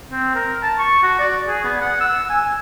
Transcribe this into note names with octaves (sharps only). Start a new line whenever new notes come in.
C4
A#4
A5
C#6
F#4
D5
G#4
B3
F#5
E6
G#5